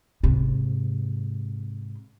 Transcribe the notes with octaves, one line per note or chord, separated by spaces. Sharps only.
G#2 C3